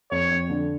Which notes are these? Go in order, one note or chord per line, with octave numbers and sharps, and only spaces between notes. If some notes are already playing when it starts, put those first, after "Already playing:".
F2 C#5
F2
D3